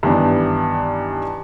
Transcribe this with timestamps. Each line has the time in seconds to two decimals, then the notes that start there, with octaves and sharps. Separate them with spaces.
0.03 G2 D#3 E3 B3 D4